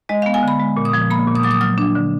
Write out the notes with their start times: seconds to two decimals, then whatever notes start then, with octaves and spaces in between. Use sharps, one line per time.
0.09 G#3 D#5
0.22 B3 F5
0.34 G#5
0.43 D3 B5
0.60 G#3
0.77 A#2
0.85 D#6
0.93 F3
1.10 A#3 B5
1.28 A#2
1.35 D#6
1.43 F#3 D6
1.51 D#6
1.61 F#3 F6
1.78 D4
1.95 D3